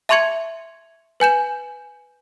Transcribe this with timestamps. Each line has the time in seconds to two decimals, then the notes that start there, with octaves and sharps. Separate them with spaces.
0.09 E5 A5 C6 C#6 G#6 C#7
1.20 B4 G#5 G6 E7